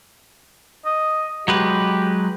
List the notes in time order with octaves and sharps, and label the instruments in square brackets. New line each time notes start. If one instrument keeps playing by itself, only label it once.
[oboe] D#5
[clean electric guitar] F#3 G#3 B4 [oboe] G4